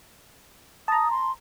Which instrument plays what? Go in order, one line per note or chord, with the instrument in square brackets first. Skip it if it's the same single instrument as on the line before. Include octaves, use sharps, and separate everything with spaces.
[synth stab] A5 A#5 [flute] D#6
[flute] C6